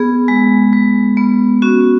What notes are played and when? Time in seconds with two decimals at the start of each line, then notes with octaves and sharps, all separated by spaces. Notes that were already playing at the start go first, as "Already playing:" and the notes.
Already playing: B3 G#4
0.28 G#3
0.73 G#3
1.17 B3
1.62 C#4 F#4